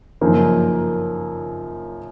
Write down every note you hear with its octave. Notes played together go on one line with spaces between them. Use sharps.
F#2 C#3 F3 A#3 D#4